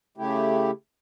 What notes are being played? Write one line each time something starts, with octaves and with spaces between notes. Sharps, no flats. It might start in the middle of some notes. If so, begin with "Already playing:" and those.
C#3 A3 E4 G4